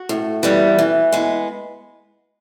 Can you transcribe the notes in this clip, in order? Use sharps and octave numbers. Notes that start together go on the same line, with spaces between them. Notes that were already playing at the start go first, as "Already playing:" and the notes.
Already playing: F#4
A2
E3 G3 B3
E3
G#3 B3